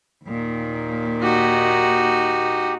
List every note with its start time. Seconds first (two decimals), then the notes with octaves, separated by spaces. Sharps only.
0.25 D#2 A#2 D#3
1.23 D#4 F#4 G4